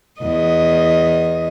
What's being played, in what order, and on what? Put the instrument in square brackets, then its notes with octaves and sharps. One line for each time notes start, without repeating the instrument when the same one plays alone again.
[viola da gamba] E2 D#5